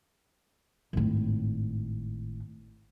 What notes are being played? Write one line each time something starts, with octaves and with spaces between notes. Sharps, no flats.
G#1 A2